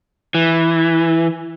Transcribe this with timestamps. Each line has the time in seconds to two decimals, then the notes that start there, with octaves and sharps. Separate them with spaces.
0.34 E3